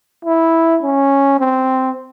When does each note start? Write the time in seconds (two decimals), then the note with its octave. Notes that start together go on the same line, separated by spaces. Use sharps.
0.25 E4
0.83 C#4
1.39 C4